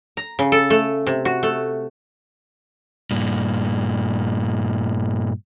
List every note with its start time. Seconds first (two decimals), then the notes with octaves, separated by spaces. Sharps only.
0.17 A#5
0.39 C#3
0.52 A4
0.70 A3
1.07 C3
1.25 F#4
1.43 A3
3.11 G2 A#2